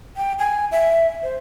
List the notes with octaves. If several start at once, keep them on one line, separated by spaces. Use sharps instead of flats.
G5
G#5
E5
C5